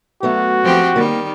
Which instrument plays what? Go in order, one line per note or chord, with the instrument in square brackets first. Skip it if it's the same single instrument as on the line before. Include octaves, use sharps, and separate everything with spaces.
[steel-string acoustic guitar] F#3 A3 B3 [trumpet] F#4
[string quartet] F3 C4 G4
[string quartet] D#3 G3 [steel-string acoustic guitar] A#3